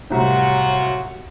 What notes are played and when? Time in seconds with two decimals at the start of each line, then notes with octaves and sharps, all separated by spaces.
0.10 C2 A2 F#3 F4 F#4